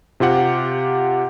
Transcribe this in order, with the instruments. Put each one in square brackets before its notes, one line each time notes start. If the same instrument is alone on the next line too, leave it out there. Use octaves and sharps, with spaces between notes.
[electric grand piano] C3 F4 G4 F#5